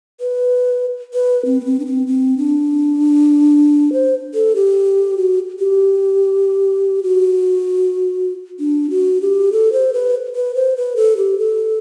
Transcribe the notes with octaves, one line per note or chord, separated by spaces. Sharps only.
B4
B4
C4
B3
C4
D4
C4
C4
D4
C5
A4
G4
F#4
G4
F#4
D4
F#4
G4
A4
C5
B4
B4
C5
B4
A4
G4
A4